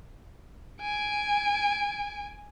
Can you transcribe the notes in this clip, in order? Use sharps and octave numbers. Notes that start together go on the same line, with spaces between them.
G#5 D7